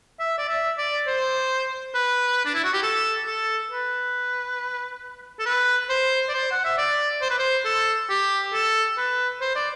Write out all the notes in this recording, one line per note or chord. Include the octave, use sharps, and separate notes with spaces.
E5
D5
E5
D5
C5
B4
D4
E4
F#4
G4
A4
A4
B4
A4
B4
C5
D5
C5
F#5
E5
D5
C5
B4
C5
A4
G4
A4
B4
C5
D5